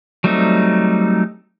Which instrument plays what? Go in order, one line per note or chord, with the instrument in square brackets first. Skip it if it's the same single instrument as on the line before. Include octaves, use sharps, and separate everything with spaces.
[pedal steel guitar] F#3 G3 A3 C4 D#4